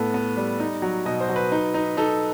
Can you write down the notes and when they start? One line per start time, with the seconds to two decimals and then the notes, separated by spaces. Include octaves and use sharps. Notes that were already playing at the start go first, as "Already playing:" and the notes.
Already playing: A2 B3 A4
0.14 B3
0.37 G3
0.60 D#4
0.82 F#3
1.06 B2 D#5
1.21 C5
1.29 F#3
1.36 B4
1.52 D#4
1.74 D#4
1.97 D#4 A4